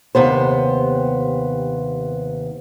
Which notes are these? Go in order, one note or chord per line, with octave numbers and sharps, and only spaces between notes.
D#2 C3 B3 C5